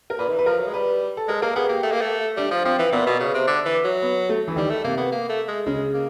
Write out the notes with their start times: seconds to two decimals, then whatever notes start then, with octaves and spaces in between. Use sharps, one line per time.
0.10 A#4
0.19 A#2 B4
0.28 D#3
0.33 E3
0.39 B4
0.46 F3 A#4
0.60 F#3
0.67 G#3
0.74 G3 B4
1.17 A4
1.28 G#3 A#4
1.42 A#3 A#4
1.56 B3 G#4
1.69 A#3 G4
1.83 A3
1.92 A#3
2.01 A3
2.37 G3 D4
2.51 F3
2.65 F3 C4
2.78 E3
2.92 A#2 B3
3.07 B2
3.20 C#3
3.34 C3
3.47 D3
3.66 E3
3.84 F#3
4.02 B3
4.29 A3
4.48 E3
4.56 D#3 G3
4.70 A3
4.84 C3 A#3
4.97 B3
5.12 A#3
5.29 A3
5.48 G#3
5.66 C#3 G#3
5.93 A#3